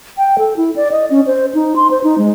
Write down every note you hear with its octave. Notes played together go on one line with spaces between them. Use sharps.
G5
A4
E4
D5
D#5
C#4
C5
D#4
C6
C5
D#4
G#3